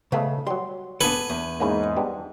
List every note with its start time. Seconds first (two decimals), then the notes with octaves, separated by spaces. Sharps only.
0.12 C#3 G#3 A3 B3
0.47 F#3 G3 C6
1.01 B3 D4 A4 B4 G#5
1.30 E2
1.60 G#2 A#3 C#4 E4
1.97 G3 B3 D4